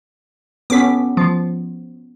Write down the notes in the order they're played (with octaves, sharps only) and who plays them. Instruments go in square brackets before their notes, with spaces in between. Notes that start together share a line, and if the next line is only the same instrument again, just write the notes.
[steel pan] B3 C#4 A4 [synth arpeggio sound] D6 B6
[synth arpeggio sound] F3